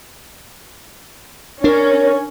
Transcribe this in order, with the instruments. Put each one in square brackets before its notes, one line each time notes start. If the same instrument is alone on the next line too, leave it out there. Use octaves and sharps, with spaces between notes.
[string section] C#4 [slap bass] D4 [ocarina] A#4